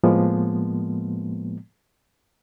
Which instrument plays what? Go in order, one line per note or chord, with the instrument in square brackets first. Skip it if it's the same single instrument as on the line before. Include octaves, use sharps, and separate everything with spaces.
[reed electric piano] A2 F3 G#3 A#3 B3